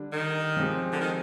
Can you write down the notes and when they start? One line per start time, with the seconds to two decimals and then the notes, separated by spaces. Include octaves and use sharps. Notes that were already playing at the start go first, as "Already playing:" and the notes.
Already playing: D3 G3 D4
0.12 D#3
0.57 F3 G#3 C4 G4
0.93 D3
1.01 D#3